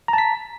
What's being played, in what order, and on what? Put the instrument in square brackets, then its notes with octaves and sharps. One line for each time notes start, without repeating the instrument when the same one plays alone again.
[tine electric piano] A#5
A5
B6